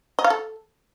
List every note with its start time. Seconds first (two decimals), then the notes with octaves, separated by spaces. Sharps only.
0.19 D#5
0.24 F5
0.30 A4